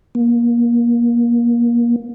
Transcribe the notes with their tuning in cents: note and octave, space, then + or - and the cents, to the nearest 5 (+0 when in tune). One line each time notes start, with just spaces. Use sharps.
A#3 +25